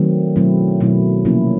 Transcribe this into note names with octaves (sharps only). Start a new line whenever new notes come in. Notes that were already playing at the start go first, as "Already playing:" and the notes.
Already playing: D#3 F#3 A3 C4
B2 F#3 A3 C4 E4
B2 F#3 A3 C4 E4
C3 F3 A#3 C#4 E4